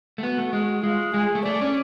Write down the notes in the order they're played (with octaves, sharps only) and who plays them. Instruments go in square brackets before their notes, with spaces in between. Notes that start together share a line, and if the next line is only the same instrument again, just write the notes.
[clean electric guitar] A3
[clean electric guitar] B3 [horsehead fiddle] F#4
[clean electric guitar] A3
G#3
[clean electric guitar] G#3 [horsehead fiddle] F4
[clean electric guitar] G#3 [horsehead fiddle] G#4
[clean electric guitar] A3
[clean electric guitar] A3 [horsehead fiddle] D5
[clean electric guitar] C#4